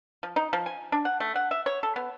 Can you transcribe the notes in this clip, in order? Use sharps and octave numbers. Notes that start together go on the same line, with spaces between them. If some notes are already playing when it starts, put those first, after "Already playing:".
F3
D#4
F3
G#5
D4
F#5
A3
F#5
E5
C#5
A4
B3